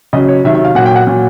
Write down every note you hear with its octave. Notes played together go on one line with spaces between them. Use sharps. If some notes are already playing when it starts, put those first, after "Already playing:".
C#3 F#3 D#5
C#5
C3 D#3 F#3 E5
E5
F5
A#2 F#3 F#5
G5
F#5
A#2 F#3